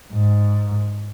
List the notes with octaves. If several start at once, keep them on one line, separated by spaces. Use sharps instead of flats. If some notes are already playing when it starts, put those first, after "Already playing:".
G#2